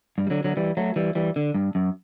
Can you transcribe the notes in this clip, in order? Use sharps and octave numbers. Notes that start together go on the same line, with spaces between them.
G2
G3
D3 F#3
D3 F#3
E3 G3
F#3 A3
E3 G3
E3 G3
D3
G2
F#2